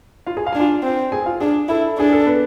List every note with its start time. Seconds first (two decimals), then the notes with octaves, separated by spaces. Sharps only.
0.26 F4 F5
0.37 G#4 G#5
0.47 F5
0.53 G#5
0.55 D4
0.61 F4 F5
0.83 C4
1.12 G#4 G#5
1.26 F4 F5
1.40 D4 G#4
1.69 E4 A4
1.98 D4 G#4
2.13 A4
2.26 B3 B4